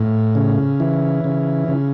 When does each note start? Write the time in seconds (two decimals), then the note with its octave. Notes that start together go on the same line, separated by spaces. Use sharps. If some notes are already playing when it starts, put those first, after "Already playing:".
Already playing: A2
0.35 C#3
0.80 E3
1.24 C#3
1.68 C#3